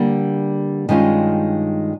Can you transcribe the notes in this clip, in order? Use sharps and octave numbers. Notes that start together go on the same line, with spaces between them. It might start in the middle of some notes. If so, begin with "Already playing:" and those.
Already playing: D3 G3 A#3
G2 D#3 G#3 C#4 F4